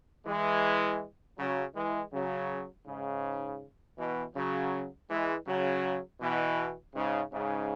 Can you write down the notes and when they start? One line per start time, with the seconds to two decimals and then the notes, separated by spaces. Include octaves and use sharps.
0.26 E3 G#3
1.38 C#3 F#3
1.75 E3 G#3
2.12 C#3 F#3
2.86 G#2 C#3
3.98 B2 E3
4.35 C#3 F#3
5.09 E3 G#3
5.46 C#3 F#3
6.21 B2 E3
6.95 G#2 C#3
7.32 G#2 C#3